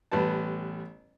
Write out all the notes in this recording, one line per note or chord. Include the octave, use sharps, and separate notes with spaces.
A1 G3 B3 A5